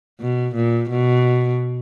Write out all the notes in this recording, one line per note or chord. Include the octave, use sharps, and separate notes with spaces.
B2
A#2
B2